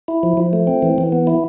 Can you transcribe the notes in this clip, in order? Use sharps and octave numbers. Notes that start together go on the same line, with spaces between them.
E4
F3
F3
A3
C4
E3
E3
B3
E4